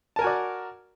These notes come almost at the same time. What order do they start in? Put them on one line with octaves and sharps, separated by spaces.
A5 A#4 G#5 F#4 D5